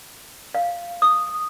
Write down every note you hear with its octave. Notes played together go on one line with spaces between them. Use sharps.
F5
D#6